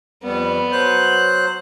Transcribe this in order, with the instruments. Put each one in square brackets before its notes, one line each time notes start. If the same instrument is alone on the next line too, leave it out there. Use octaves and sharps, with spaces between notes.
[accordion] F2 G3 [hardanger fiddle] B3
[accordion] F#3 C5 F#6